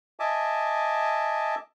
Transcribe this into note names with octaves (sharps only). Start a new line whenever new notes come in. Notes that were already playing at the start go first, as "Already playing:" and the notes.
D#5 E5 G#5 A5 D6